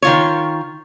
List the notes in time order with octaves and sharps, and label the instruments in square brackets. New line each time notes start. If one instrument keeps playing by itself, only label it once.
[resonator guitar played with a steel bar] D#3 F4 C#5